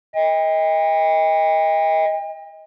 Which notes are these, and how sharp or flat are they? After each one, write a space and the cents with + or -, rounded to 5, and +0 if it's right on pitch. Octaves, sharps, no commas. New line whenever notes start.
D#5 +30 G5 +40